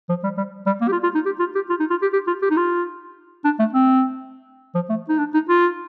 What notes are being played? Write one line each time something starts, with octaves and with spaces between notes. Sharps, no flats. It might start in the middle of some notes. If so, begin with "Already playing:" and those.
F3
G3
G3
G3
A#3
G4
F4
F4
D#4
G4
F4
G4
F4
D#4
F4
G4
G4
F4
G4
D#4
F4
D4
A3
C4
F3
A3
D#4
D4
D#4
F4